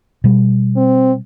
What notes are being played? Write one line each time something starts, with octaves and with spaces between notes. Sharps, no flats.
B2 G3
C4